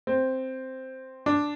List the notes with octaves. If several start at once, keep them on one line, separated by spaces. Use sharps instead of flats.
C4
D4